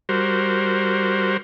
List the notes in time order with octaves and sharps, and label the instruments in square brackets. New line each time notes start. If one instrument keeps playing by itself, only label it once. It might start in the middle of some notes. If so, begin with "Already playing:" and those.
[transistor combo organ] G3 F#4 A#4 C5